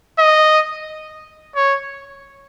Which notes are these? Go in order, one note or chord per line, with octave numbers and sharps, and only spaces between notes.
D#5
C#5